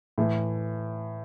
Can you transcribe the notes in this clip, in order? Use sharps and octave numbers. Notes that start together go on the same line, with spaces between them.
A2 E3 A3